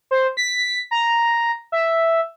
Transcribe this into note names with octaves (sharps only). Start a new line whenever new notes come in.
C5
B6
A#5
E5